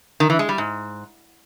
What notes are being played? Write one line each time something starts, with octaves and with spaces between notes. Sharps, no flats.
D#3
E3
G#3
G3
G#2